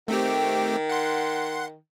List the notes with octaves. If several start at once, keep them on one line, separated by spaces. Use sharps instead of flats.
D#3 A3 C4 G4
F#5 C6